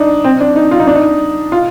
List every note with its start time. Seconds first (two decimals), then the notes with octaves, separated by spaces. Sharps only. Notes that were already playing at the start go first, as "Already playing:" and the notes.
Already playing: D4 D#4
0.24 C4
0.41 D4
0.56 D#4
0.71 F4
0.80 D#4
0.87 D4
0.96 D#4
1.52 F4